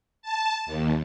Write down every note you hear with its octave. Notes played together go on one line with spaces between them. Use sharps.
A5
D#2